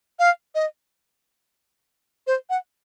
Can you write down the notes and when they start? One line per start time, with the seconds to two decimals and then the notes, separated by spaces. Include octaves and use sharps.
0.19 F5
0.55 D#5
2.27 C5
2.50 F#5